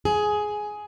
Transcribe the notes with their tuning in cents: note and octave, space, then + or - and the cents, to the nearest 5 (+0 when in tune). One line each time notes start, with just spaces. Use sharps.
G#4 +10